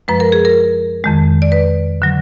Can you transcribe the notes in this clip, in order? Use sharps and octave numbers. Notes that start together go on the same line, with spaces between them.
F#2 F3 G#3 B4
A#4
G#4
A#4
F2 D#3 G#3
D5
B4
D3 F#3